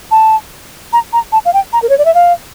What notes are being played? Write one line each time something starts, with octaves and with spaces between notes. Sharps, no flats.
A5
A#5
A#5
A5
F5
G5
A#5
A#4
C#5
D5
E5
F5